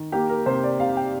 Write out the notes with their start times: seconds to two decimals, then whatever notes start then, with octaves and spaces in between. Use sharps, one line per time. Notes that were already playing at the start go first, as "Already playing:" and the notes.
Already playing: D#3
0.12 A#3 G4
0.29 A#4
0.46 C3 C5
0.63 D5
0.80 C3 F5
0.97 G5